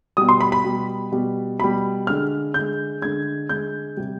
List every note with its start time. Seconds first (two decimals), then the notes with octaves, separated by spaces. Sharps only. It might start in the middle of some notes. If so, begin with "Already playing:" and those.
0.17 B2 G3 D#6
0.29 C6
0.41 B5
0.52 B5
0.64 B2 G3
1.12 B2 G3
1.60 B2 G3 B5
2.07 D3 G#3 F6
2.54 D3 G#3 G6
3.02 D3 G#3 G#6
3.49 D3 G#3 G6
3.97 C3 G3